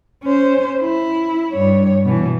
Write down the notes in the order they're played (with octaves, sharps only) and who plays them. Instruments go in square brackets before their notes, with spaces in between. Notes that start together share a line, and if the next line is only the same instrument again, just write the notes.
[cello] C#4 C5
E4
G2 C#5
B2 E3